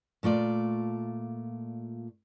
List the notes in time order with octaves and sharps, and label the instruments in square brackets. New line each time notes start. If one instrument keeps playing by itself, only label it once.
[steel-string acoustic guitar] A#2 A3 F4 D5